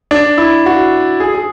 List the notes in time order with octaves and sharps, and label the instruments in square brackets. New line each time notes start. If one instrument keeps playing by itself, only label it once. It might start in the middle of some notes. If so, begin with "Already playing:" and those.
[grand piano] D4
E4
F#4
G#4
G#4